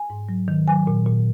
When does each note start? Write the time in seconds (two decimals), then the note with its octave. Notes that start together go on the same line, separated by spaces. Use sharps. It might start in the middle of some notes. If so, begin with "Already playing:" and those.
Already playing: G#5
0.10 G#2
0.29 F#3
0.48 D#3
0.67 F#3 G#5
0.87 A#2
1.07 A#2